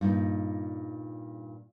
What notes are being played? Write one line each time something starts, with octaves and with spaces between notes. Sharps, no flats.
G2 A#2 D#4